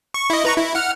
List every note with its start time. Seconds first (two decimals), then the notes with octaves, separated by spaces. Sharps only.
0.14 C#6
0.30 E4 D#5
0.45 B4 A#5 C#6
0.57 E4
0.75 F#5 F6